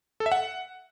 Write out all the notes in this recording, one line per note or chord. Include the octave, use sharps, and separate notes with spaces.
A4
E5
F#5